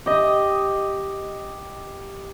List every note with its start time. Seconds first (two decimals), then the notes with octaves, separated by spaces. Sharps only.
0.06 G4 D#5